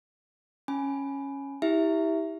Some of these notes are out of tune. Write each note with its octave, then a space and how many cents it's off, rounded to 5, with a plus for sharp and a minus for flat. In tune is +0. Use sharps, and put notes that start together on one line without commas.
C#4 -10 G#5 +15 B5 +0
E4 -30 G4 +5 E5 +0